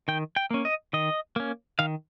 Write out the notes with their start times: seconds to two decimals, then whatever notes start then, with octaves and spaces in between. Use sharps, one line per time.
0.08 D#3 G5
0.36 G5
0.51 A#3 C#4
0.65 D#5
0.93 D#3 D#5
1.36 A#3 C#4
1.79 D#3 F5